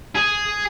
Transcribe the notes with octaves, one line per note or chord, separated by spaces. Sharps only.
G#4